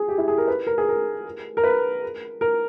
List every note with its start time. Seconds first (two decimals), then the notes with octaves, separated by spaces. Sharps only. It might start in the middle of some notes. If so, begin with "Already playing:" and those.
Already playing: G#4
0.08 G4
0.18 E4
0.28 G#4
0.38 A#4
0.48 B4
0.67 A#4
0.78 G#4
0.89 A#4
1.57 A#4
1.63 B4
2.41 A#4